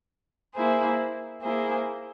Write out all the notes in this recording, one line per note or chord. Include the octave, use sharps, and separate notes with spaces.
A#3 E4 G#4 C5
A#3 E4 G#4 C5